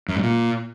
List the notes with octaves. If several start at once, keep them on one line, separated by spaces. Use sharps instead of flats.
F#2
G#2
A#2